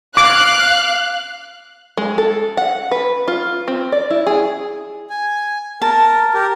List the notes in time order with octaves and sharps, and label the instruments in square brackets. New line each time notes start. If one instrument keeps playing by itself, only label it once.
[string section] F5 F#6 [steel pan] D6
[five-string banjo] G#3
A4
F#5
B4
F4
C4
D5
E4
G#4
[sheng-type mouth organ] G#5
[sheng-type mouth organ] A#4 [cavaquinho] A5
[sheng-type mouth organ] G4 A#4